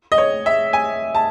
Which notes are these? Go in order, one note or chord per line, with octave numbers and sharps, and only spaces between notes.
D#5
C#5
E5
G#5
A5